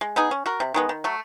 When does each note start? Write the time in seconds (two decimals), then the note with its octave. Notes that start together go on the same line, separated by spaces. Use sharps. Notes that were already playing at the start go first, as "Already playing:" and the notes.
0.01 G#3
0.16 B3 D#4 G#4
0.31 C#4
0.46 F#4 A#4
0.60 C3
0.74 D#3 G#3 B3
0.89 D#3
1.04 F#3 A3